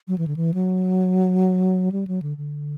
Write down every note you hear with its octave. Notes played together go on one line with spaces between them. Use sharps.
F#3
E3
D3
E3
F#3
G3
F#3
D3
D3